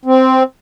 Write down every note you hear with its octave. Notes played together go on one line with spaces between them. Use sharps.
C4